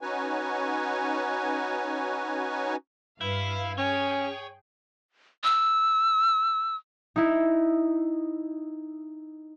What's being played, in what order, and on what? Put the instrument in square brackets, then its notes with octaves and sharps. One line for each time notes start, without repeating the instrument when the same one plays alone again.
[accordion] C#4 D#4 F#4 B4 C#5 G#5
[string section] G2 B4 F5 [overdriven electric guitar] E4
[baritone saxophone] C#4 [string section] G#4 G5 [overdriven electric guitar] C#5
[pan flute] E6
[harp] D#4 E4